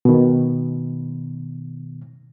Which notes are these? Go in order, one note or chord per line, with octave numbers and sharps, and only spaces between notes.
B2 D#3